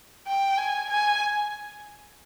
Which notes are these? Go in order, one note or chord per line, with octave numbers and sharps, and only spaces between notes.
G5
G#5
G#5